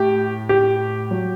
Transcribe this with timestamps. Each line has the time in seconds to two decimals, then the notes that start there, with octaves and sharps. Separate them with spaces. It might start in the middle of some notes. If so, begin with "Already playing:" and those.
Already playing: A2 G4
0.49 G4
1.11 F#3